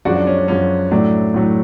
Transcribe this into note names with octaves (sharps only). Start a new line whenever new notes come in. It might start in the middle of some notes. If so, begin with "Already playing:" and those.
F#2 F3 G#3 D4 F#4
D4
C#4
D4
F#2 F3 G#3 C#4
A2 F#3 A3 D4
A2 F#3 A3